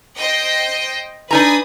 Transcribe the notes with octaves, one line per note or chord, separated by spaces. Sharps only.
C5 D#5 G5
D4 D#4 B4 G#5 A#5 D#6